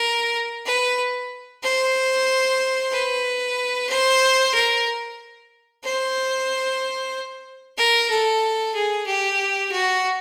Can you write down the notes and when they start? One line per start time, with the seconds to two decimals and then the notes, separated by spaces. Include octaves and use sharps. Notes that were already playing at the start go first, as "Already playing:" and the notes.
Already playing: A#4
0.65 B4
1.63 C5
2.92 B4
3.89 C5
4.54 A#4
5.84 C5
7.77 A#4
8.10 A4
8.74 G#4
9.06 G4
9.72 F#4